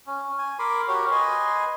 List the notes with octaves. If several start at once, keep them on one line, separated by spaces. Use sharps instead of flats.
C#4
G#5
A#4 B5 C6 D6
F#4 G4 A#4 C#5
B4 D#5 G#5 C6